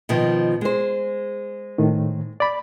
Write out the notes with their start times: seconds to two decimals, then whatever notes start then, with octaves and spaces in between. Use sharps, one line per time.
0.09 B2 D#3 F3
0.61 G#3 C5
1.78 A2 D#3
2.40 D5 B5